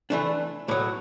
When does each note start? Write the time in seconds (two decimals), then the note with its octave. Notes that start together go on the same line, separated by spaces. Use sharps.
0.10 E3 A3 D4
0.68 B1 A2 F#3